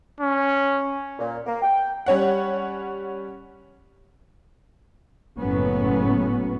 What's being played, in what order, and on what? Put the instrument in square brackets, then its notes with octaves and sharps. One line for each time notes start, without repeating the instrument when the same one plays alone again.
[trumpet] C#4
[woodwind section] A#2
A#3
G5
[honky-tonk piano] G3 C#4 C#5 F#5
[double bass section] F#1 A2 F#3 B3 C#4